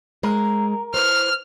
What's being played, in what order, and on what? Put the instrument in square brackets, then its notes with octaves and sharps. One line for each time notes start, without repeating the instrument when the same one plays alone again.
[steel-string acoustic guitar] G#3 [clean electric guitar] A#4
[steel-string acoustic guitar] E4 B4 C5 [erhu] F6